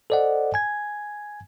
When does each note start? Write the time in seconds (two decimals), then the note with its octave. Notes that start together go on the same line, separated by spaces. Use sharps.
0.10 A4 C5 D5 D#5 F#5
0.54 G#5 G#6